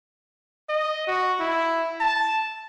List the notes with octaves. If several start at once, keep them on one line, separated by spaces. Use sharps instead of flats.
D#5
F#4
E4
A5